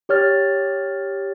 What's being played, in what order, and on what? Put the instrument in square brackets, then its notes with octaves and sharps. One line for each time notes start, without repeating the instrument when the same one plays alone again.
[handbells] G4 C#5 F6 A6